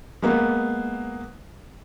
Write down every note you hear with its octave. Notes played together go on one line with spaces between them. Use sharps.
G#3 A#3 B3